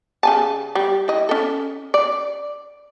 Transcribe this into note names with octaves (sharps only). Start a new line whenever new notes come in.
C#3 G#5 A5
G3
E4 D#5
C#4 A4
D5